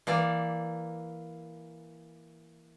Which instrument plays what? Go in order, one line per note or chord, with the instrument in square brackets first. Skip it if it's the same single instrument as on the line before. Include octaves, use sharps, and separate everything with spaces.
[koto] E3 A#3 D5